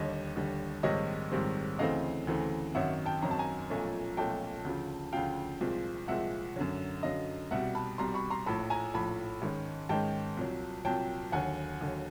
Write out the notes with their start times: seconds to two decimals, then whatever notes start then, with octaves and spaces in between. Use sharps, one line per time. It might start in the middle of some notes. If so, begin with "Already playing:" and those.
Already playing: D#2 D3 G3 C#5 D#5
0.36 D#2 D3 G3
0.83 A#1 G#2 D#3 G3 C4 C#5 D#5
1.32 A#1 G#2 D#3 G3 C4
1.79 D2 C#3 E3 A3 C4 D#5 F5
2.27 D2 C#3 E3 A3 C4
2.75 G#1 F#2 D#3 F#3 E5 F#5
3.06 G5 A5
3.22 G#1 F#2 D#3 F#3 A#5
3.31 A5
3.39 G#5 A#5
3.70 B1 A#2 F3 A3 C#4
4.17 B1 A#2 F3 A3 C#4 G5 A5
4.65 D2 C#3 F3
5.13 D2 C#3 F3 F5 G5
5.61 C2 A#2 F3 G#3 C4
6.08 C2 A#2 F3 G#3 C4 E5 F#5
6.56 F#2 D3 F#3
7.03 F#2 D3 F#3 D#5 F5
7.51 C2 B2 G3 E5 F#5
7.75 A5 B5
7.98 C2 B2 G3 A#5 C6
8.14 B5 C#6
8.31 A#5 C6
8.46 A#1 A2 F3 A5 B5
8.70 G#5 A#5
8.94 A#1 A2 F3 A5 B5
9.42 G#2 D#3 G#3 C#4
9.89 G#2 D#3 G#3 C#4 G5 A5
10.37 C2 A#2 F#3
10.85 C2 A#2 F#3 G5 A5
11.32 D#2 D3 F#3 F#5 G#5
11.81 D#2 D3 F#3